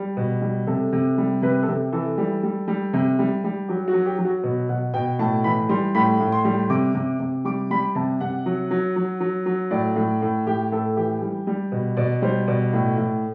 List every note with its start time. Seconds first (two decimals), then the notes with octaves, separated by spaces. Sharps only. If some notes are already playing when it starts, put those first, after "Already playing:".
Already playing: G3
0.17 B2
0.42 G3
0.67 C3 A4
0.92 C3
1.18 G3
1.42 C3 B4
1.63 A4
1.68 C3 G4
1.92 E3 A4
2.18 G3
2.43 G3
2.68 G3
2.93 C3
3.19 G3
3.44 G3
3.68 F#3 G4
3.88 F#4
3.94 F#3
4.06 G4
4.19 F#3
4.25 F#4
4.43 B2
4.69 B2 F#5
4.94 B2 G5
5.19 A2 A5
5.44 E3 B5
5.69 G3 C6
5.95 A2 B5
6.20 A2
6.32 C6
6.45 G3
6.70 C3 D6
6.95 C3
7.20 C3
7.45 G3 D6
7.70 G3 B5
7.95 C3 A5
8.20 C3 F#5
8.46 F#3
8.71 F#3
8.96 F#3
9.20 F#3
9.46 F#3
9.71 A2 D5
9.96 A2
10.22 A2
10.46 A2 G4
10.72 A2 A4
10.96 E3 G4
11.22 G3
11.47 G3
11.72 B2
11.97 B2 D5
12.22 G3 C5
12.47 B2 D5
12.73 A2
12.97 A2